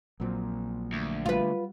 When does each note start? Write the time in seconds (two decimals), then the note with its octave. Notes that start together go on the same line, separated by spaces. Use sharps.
0.20 A#1 A#2 F#3 C4
0.93 D2
1.26 G3 F4 F#4 B4 F#5